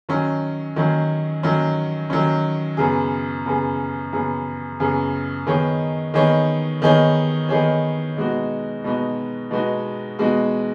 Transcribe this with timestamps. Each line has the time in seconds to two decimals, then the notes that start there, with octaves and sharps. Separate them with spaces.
0.09 D#3 F#3 C#4
0.76 D#3 F#3 C#4
1.43 D#3 F#3 C#4
2.10 D#3 F#3 C#4
2.77 F#2 C#3 B3 G#4
3.46 F#2 C#3 B3 G#4
4.13 F#2 C#3 B3 G#4
4.80 F#2 C#3 B3 G#4
5.47 D#3 B3 D#4 G#4 C#5
6.14 D#3 B3 D#4 G#4 C#5
6.82 D#3 B3 D#4 G#4 C#5
7.49 D#3 B3 D#4 G#4 C#5
8.17 B2 G#3 B3 D#4 F#4
8.84 B2 G#3 B3 D#4 F#4
9.51 B2 G#3 B3 D#4 F#4
10.19 B2 G#3 B3 D#4 F#4